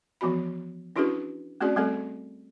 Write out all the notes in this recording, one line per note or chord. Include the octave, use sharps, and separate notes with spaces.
E3 F3 B3 F#4 B5
C#4 D4 E4 F#4 G#4 B4
A3 C4 C#4 F#4 G#4 D5
G3 A3 C4 G#4 A4